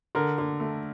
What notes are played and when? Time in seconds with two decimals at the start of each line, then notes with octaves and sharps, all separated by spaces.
0.15 D3 A#4
0.38 D3
0.60 A3